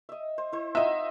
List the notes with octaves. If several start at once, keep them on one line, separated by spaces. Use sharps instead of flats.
D#5 E5
C5
E4 C5
D#4 F4 D#5 E5 F#5